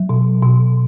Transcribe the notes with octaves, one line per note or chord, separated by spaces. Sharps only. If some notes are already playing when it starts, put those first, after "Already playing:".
Already playing: F#3
B2
B2